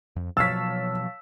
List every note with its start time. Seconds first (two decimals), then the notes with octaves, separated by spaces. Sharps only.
0.16 F2
0.37 B2 F3 F#3 C#5 F5 A5 E6 B6